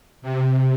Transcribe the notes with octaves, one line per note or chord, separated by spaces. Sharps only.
C3